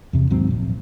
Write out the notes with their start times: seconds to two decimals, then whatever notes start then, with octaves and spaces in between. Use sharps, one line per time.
0.13 E2 C3
0.30 D#2 G#2 F#3 C4
0.50 A#1